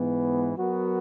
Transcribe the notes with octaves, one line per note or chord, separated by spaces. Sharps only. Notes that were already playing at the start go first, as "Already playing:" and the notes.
Already playing: G#2 E3 B3
F#3 B3 F#4 A#4